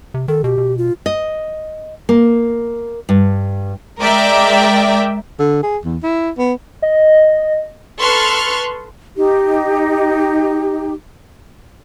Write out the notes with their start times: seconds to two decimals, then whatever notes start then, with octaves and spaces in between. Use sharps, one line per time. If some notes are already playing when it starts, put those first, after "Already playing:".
0.14 C3
0.28 D#3 A4
0.44 B2 G4
0.58 B2
0.78 F4
1.06 D#5
2.09 A#3
3.09 G2
4.00 G#3 A#4 D5 E5 G5
5.39 D3
5.63 G#4
5.85 E2
6.03 E4
6.38 B3
6.82 D#5
7.99 A4 B4 C6 C#6 F6 F#6
9.17 D#4 G4